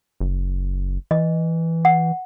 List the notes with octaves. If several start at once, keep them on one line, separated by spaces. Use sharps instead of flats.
F#1
E3 D#5
F#5